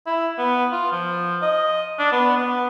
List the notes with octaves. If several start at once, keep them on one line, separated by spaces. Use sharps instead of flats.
E4
B3
F4
F3
D#5
D4
B3
B3